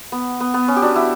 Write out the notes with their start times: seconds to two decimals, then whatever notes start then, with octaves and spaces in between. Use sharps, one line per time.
0.12 B3
0.40 B3
0.54 B3
0.68 C#4
0.76 G4
0.82 D4 F#4
0.95 E4 G4